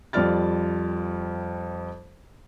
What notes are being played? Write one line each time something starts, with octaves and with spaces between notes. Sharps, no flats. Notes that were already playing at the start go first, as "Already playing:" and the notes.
F2 G3 F4 D5 F6 A6